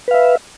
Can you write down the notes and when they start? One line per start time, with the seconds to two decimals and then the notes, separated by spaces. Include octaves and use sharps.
0.08 B4
0.11 F5
0.14 E5